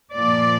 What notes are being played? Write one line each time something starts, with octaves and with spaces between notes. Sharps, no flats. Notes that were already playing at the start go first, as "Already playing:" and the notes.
A#2 F3 D5